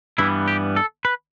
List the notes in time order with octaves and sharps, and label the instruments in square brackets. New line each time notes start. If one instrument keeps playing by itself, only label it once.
[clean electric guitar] G2 E3 G3 B3 E4
G4
A4
B4